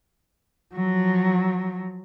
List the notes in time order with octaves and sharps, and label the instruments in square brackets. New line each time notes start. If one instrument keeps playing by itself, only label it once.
[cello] F3 F#3